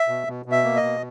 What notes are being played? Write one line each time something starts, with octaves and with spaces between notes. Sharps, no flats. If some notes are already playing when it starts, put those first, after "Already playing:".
Already playing: E5
B2
B2
B2
E5
A#3
D#5
B2